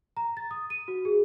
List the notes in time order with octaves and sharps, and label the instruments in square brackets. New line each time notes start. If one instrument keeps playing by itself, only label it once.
[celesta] A#5
A6
D#6
D#7
F#4
G#4